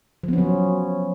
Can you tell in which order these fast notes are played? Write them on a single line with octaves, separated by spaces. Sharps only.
F3 B3 C#4 F#3